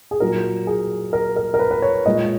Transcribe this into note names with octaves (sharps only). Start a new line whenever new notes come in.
G#4
A#2 F#3 A#4
G#4
A#4
A#4
A#4
B4
B4
C#5
A#2 G#3 D#5